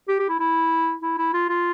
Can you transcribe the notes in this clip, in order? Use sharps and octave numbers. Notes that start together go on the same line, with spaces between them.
G4
G4
E4
E4
E4
E4
F4
F4